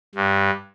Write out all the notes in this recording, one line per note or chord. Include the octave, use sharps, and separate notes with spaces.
G2